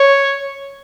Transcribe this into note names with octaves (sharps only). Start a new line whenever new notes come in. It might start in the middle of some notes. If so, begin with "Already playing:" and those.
Already playing: C#5